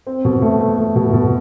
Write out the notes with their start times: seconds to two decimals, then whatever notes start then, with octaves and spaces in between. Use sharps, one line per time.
0.07 C4
0.25 B2
0.42 A3
0.60 A3
0.78 A3
0.96 B2
1.13 B2